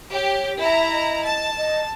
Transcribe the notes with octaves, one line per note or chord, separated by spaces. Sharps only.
G4 C#5
E4 E5 A#5
D#5
A5
D#5